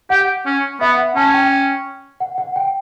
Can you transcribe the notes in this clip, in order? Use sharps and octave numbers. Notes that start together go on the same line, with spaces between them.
G4 F#5
C#4
B3 E5
F#5
C#4 A5
G5
F#5
F#5
G5